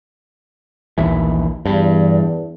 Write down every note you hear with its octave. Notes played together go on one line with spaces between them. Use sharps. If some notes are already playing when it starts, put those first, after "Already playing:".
A#1 D#2 E3
E2 G2